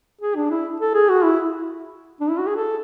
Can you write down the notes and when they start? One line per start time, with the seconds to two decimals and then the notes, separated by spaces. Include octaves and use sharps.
0.21 G#4
0.36 D4
0.51 E4
0.80 A4
0.94 G#4
1.09 F#4
1.24 E4
2.20 D4
2.29 E4
2.39 F#4
2.47 G#4
2.56 A4